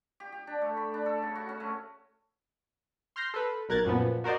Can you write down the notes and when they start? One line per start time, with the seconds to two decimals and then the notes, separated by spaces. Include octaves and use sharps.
0.20 G4
0.32 G4
0.47 D4
0.61 A3
0.77 B5
0.94 D4
1.06 A4
1.22 C#3
1.35 F#4
1.49 C#4
1.60 A3
3.16 C6 F6 G6 A#6 C7
3.34 A4 B4
3.69 B1 A#4 F#6 G#6 A6
3.85 F#2 A#2 F3 B3
4.24 F#4 A#4 C5 D5 D#5